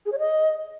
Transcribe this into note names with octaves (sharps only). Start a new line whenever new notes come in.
G#4
C#5
D#5